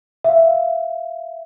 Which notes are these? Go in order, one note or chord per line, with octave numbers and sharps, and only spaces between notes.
E5 F5